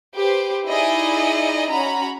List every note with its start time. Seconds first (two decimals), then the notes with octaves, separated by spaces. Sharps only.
0.15 G4 B4 C5
0.69 D#4 E4 G#4 D5 D#5
1.72 C#4 F#4 A#5 B5